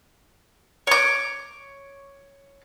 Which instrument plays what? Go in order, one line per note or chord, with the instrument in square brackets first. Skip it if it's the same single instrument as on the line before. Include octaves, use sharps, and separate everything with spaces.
[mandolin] C#5 D6